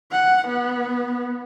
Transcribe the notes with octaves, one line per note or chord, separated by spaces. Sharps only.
F#5
B3